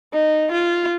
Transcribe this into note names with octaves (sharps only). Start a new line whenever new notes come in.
D#4
F4